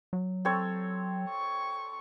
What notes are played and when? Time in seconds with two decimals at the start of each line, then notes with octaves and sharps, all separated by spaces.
0.13 F#3
0.45 C4 A4 C#5
1.29 C#6